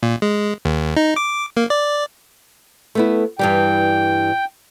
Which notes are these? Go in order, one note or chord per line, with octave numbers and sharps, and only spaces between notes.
A#2
G#3
D#2
D#4
D6
A#3
D5
A3 B3 E4
G2 E3 G3 G5